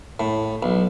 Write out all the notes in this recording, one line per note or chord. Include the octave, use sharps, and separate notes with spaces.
A2
B1